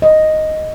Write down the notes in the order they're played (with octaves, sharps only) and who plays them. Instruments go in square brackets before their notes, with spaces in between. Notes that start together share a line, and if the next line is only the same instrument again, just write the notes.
[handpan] D#5